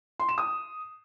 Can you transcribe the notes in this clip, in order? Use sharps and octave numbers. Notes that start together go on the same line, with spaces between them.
C6
E7
D#6